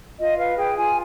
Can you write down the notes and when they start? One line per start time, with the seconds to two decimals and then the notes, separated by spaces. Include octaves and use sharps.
0.18 F4 D#5
0.38 B4 F5
0.57 G#4 G5
0.76 F4 G#5